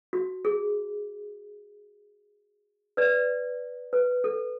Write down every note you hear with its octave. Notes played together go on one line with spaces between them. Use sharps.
F#4
G#4
B4 D5
B4
A4